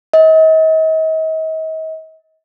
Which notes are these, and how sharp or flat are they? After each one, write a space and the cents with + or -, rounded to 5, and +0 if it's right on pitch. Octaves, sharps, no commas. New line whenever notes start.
D#5 +40